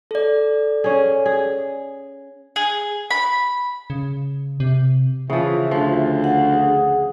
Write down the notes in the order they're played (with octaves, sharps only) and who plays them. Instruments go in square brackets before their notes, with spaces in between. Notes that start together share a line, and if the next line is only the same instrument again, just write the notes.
[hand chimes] A4 D5
[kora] C#4 G#4
G#4
[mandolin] G#4
B5
[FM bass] C#3
C3
[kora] C#3 F3 [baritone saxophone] E3 [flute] E5
[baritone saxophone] D2 [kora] F3
[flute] F5 [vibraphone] F#5
[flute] G#4